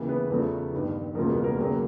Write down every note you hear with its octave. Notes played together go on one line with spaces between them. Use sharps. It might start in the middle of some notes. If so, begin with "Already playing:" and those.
Already playing: D#2 C#3 E3
B3 B4
E2 C#3 F3 A3
G1 G2 D#3
E1 D2 C#3 F3 A#3 A#4
B3 B4
A#3 A#4
D#2 C#3 F#3 A#3